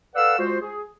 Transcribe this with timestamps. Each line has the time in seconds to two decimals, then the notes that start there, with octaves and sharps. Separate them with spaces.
0.15 A4 B4 D5 F5 F#5 E6
0.38 G#3 F4 F#4 C5
0.61 G#4